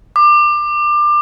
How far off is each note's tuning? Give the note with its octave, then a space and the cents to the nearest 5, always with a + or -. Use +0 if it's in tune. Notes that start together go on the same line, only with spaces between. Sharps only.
D6 +25